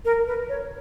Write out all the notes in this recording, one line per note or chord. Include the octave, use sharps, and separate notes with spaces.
A#4
B4
C#5